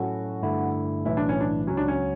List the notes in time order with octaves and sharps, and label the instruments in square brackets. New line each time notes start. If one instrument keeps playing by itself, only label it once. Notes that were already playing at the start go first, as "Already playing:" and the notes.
Already playing: [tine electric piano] A2 F#3 C#4 E4 A4 [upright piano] F#4
[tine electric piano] G2 D3 A3 E4
[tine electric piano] B1 A2 E3 [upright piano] E4
[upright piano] D4
C#4
D4
[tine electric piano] C#2 C#3 F#3 [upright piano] C#4
[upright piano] D4
C#4